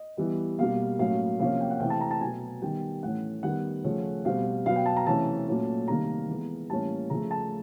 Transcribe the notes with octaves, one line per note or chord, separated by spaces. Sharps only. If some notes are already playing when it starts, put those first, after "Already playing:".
Already playing: D#5
E3 G3 B3
B2 G3 A#3 F5
A2 F#3 A#3 C#4 F5
C3 F3 A#3 C#4 F5
G5
F#5
C3 E3 A3 C4 G5
A5
A#5
A5
B2 F#3 B3 G#5
D#3 G3 B3 G5
A2 E3 A3 C#4 F#5
D#3 G3 B3 F#5
C#3 F3 A3 C#4
B2 G3 C4 F5
B2 F#3 B3 F5
G5
A5
A#5
C3 E3 A3 C#4 A5
A#2 F#3 A3 C#4
C3 D#3 G3 A#3 A#5
E3 G#3 B3
A2 E3 G3 A#3 C#4 A5
C#3 F3 A3 A#5
A5